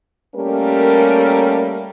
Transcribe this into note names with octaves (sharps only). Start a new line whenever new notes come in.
G3 A3 A#3 C#4 G4 A#4